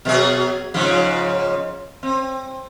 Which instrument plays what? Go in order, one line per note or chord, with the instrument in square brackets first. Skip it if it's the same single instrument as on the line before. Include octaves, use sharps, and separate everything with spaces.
[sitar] B2 F#3 G#4
G#2 C#3 F3
C4